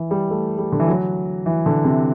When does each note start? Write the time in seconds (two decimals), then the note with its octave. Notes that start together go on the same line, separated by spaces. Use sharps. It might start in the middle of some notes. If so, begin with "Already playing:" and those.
Already playing: E3
0.11 G3
0.31 A3
0.58 G3
0.72 D3
0.80 E3
0.88 F#3
1.46 E3
1.66 D3
1.84 C3